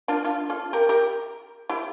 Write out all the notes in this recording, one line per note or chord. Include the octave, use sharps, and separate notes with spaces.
D4 F4
D4 F4
F4 A4
G4 A#4
G4 A#4
E4 G4